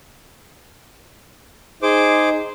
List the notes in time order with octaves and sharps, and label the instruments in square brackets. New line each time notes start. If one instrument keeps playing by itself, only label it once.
[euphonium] D#4 [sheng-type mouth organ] G#4 C5 D6